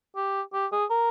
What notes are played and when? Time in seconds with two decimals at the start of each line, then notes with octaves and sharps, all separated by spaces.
0.16 G4
0.53 G4
0.72 G#4
0.90 A#4